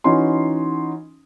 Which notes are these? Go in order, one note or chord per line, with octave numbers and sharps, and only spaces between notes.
E3 C#4 D#4 F#4 C6